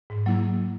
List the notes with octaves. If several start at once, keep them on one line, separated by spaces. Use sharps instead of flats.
G#2
F#3 A#3 E4